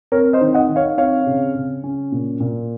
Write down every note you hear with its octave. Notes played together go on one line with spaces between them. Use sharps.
C4 A#4 C#5
C5 D#5
D#3
D#5 F#5
D#3
C#5 F5
C4 C#5 F5
C#3
C#3
C#4
A#2
A#2